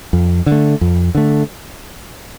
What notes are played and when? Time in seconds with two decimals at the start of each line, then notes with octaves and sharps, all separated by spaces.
0.13 F2
0.46 D3
0.52 A3
0.81 F2
1.15 D3 A3